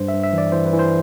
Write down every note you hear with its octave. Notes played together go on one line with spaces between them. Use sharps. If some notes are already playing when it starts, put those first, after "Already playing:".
Already playing: G2 C5
E5
G2
E5
E3 D5
E3 C5
B4
E3
C5